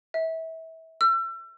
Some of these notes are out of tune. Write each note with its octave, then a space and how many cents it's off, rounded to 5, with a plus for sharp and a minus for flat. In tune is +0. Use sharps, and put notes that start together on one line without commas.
E5 -30
E6 +35